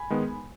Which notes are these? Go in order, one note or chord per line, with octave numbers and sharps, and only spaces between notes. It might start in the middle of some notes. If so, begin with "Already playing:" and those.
Already playing: G#5 B5
D#3 G#3 B3